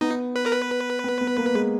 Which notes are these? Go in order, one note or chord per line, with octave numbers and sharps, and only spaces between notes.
B3 D#4
B4
A#4
B4
B3
B3
A#3
G#3